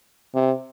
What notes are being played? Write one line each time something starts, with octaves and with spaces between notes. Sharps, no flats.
C3